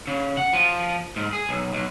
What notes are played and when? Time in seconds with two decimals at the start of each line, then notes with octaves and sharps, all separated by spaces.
0.07 C#3
0.37 F#5
0.53 F3
1.16 G#2
1.33 G#4
1.49 B1
1.73 B1